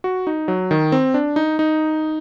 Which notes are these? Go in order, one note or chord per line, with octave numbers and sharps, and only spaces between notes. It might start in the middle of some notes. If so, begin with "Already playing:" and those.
F#4
D#4
F#3
D#3
C4
D4
D#4
D#4